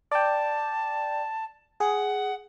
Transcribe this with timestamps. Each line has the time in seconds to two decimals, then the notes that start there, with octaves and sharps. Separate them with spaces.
0.12 D5 G5 A5
1.80 G#4 F#5